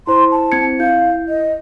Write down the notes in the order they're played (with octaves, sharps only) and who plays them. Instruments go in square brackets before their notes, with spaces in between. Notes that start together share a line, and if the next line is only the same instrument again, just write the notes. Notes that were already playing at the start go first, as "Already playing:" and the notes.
[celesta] E4 C5 [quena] C6
[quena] A5
[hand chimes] C4 G#6 C#7
[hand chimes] E4 [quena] F5 [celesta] G6
[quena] D#5